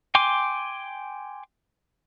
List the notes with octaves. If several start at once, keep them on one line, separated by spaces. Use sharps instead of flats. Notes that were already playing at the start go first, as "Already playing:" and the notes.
G5 G#5 C6 D6